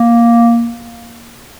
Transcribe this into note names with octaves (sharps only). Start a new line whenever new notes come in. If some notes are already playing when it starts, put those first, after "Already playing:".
Already playing: A#3